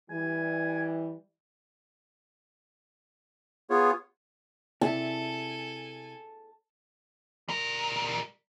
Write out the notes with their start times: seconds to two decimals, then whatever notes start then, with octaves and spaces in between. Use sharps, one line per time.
0.10 E3 G3 G#5
3.70 B3 F4 G#4 C#5
4.81 C3 E4 A4 G#5 A5
7.49 G3 A#4